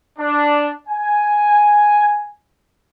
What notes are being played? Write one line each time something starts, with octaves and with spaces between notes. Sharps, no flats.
D4
G#5